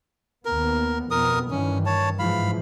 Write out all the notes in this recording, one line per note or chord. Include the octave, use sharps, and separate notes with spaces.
D#2 B3 A#4
F2 B2 B3 A#4 D#6
G2 D#3 E3 C#4
C#5 A5
G#2 E3 F3 F5 B5